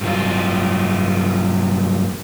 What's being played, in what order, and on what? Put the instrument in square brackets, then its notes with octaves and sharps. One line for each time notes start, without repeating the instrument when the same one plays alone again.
[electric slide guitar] G2 C3 F#3 F4